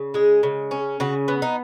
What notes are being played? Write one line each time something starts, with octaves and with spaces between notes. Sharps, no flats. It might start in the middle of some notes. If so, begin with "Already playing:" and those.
Already playing: C#3
G#3 G#4
C#3
C#4
C#3 F#4
B3
D#4